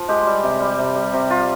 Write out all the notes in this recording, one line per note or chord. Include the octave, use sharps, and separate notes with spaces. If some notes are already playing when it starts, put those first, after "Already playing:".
Already playing: F3
G#3 G4
G3
C3
G3
C3
G3
C3
G3 F4